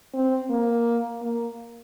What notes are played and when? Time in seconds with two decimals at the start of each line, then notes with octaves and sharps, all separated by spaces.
0.14 C4
0.50 A#3
1.23 A#3